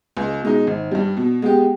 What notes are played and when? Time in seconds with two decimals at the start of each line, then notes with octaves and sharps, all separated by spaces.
0.17 C#2
0.42 B2 G#3 D#4
0.67 G#1
0.91 G2 G3
1.17 B2
1.42 G#3 B3 G4